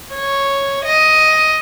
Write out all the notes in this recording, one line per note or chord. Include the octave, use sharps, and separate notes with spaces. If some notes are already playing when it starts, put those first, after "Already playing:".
C#5
D#5